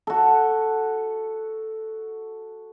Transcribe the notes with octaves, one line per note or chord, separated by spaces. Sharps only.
F#4 A4